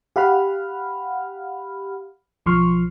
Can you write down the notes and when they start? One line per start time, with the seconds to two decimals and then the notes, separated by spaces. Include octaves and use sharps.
0.16 G4 F5 F#5 B5 F6
2.46 B1 F3 C6 C#6 F6